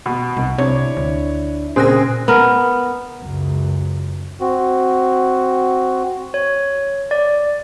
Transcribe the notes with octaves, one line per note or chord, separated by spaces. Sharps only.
B2
C2 D#4
C3 D4 E4 C#5 D5
D2
A#2 C#3 C4 C#4 G#4 F#6 A#6
B3 A#4
C#2 F#2
C4 F#4
C#5
D5